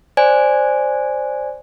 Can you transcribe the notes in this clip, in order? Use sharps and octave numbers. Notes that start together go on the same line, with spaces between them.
C5 D5 G#5